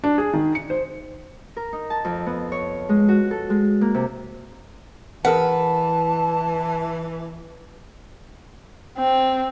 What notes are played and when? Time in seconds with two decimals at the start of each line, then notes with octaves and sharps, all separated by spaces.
0.04 D4
0.18 G#4
0.33 D#3
0.55 C#7
0.70 C5
1.57 A#4
1.73 D#4
1.90 A5
2.05 F2
2.26 B3
2.52 C#5
2.89 G#3
3.09 F#4
3.31 A4
3.50 G#3
3.81 A#3
3.95 C3
5.25 E3 G#4 A#4 B4 F#5 A5
8.98 C4